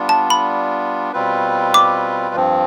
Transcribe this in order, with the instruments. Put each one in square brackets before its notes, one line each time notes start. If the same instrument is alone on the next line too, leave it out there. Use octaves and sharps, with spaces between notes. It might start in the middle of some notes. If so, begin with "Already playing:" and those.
Already playing: [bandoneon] G3 B3 D4 F4
[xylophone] A5
B5
[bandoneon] B2 G3 C4 F4 B4
[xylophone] D6
[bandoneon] G2 F3 C4